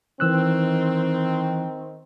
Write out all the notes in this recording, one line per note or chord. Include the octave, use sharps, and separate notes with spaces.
D#3 E3 C4 E6 F#6